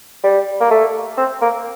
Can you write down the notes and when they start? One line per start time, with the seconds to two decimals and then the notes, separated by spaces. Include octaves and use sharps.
0.24 G3
0.60 A#3
0.71 A3
1.17 C4
1.41 A#3